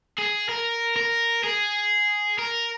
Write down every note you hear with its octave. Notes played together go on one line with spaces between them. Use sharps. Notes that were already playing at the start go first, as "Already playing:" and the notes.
G#4
A#4
A#4
G#4
A#4